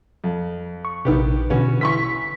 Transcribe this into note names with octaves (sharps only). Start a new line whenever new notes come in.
F2
C#6
A#1 C3 D#3 B3 G4
B2 D3 E3 B3 C#4 F#4
E3 C6 C#6 B6